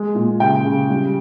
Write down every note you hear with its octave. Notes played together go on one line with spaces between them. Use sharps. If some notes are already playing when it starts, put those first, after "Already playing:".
Already playing: G#3
A#2
C#3 G5
C#3
G3